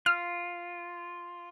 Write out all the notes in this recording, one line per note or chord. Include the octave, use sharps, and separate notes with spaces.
F4 F6